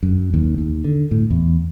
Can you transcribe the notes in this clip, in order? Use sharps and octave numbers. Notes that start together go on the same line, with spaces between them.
F#2
D#2
D#2
D3
A2
E2